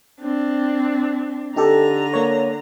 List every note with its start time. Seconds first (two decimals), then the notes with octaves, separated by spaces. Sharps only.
0.20 C4 D4
1.56 D3 D#4 G4 A4 A#5
2.13 A#3 C#5